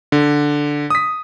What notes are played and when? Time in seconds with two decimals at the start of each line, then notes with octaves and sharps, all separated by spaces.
0.12 D3
0.90 D#6 B6